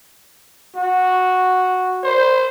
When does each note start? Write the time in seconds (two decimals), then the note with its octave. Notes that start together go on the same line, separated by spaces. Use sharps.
0.76 F#4
2.04 C5